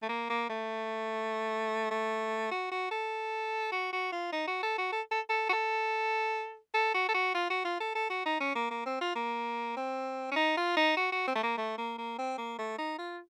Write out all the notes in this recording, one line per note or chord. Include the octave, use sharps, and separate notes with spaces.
A3
A#3
A#3
A3
A3
F#4
F#4
A4
F#4
F#4
F4
D#4
F#4
A4
F#4
A4
A4
A4
F#4
A4
A4
F#4
A4
F#4
F4
F#4
F4
A4
A4
F#4
D#4
C#4
A#3
A#3
C4
F4
A#3
C4
C#4
D#4
F4
D#4
F#4
F#4
C4
A3
A#3
A3
A#3
A#3
C4
A#3
A3
D#4
F4